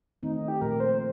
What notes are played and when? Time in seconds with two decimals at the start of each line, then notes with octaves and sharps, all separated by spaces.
0.23 D#3 A3 C4 D#4
0.35 D#4
0.48 G4
0.61 A#2 F3 A3 A#4
0.80 C5